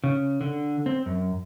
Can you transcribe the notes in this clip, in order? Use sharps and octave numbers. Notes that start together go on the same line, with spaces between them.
C#3
D3
C4
F#2